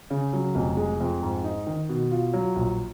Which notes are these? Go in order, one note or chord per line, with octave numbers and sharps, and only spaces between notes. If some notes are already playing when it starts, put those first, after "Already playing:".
C#3
F#3
F1
G#3
F2
G#2
D#4
D#3
B2
F4
F#3
A#1